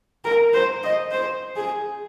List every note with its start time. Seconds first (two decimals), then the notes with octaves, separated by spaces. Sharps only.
0.25 A#4
0.54 C5
0.83 D#5
1.11 C5
1.56 G#4